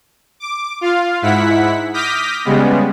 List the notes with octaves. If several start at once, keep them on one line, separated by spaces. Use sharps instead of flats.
D6
F4 F5
G#2 E4 F#5 B6
D6 D#6 F6 G6 A#6 B6
C#3 G3 G#3 B3